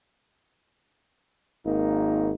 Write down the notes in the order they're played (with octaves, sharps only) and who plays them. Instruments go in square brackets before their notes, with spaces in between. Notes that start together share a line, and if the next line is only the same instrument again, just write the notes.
[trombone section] G#1 A#3 D#4